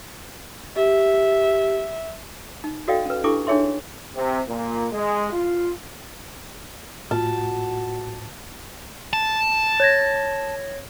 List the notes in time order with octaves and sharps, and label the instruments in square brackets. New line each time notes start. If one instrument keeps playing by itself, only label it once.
[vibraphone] G4 [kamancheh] E5
[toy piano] D#4
F#4 A4 D5 D#5 F5 G5
C#4 B4
D4 E4 G4 A4 C#6 D6
D4 D#4 G#4 C#5 E5 C6
[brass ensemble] C3
A#2
G#3
F4
[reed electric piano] A2 [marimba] F4 [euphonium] F#4 [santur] A5
[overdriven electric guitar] A5
[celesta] C#5 G#6 A#6